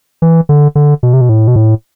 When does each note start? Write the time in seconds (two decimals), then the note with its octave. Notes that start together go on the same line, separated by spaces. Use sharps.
0.22 E3
0.49 D3
0.75 D3
1.03 B2
1.13 C3
1.21 B2
1.29 A2
1.48 B2
1.56 A2